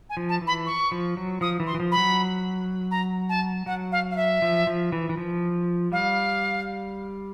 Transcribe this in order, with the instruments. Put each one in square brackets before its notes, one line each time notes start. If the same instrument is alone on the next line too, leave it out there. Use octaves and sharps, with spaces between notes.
[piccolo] G#5
[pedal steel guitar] F3
[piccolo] A5
[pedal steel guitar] E3
[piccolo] B5
C#6
[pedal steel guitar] F3
F#3
[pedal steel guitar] F3 [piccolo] D#6
[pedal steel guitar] E3
[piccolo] C6
[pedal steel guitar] E3
F3
[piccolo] B5
[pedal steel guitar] F#3
[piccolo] A#5
A5
[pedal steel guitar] F#3 [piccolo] F#5
[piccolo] F5
F5
E5
[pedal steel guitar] F3
F3
E3
E3
F3
[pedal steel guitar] G3 [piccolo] F5